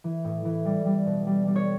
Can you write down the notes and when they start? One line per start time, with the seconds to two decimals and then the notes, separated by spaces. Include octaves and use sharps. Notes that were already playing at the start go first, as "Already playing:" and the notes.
0.04 E3
0.25 A2
0.45 E3
0.65 G3
0.86 G3
1.06 B2
1.27 G3
1.47 G3
1.56 C#5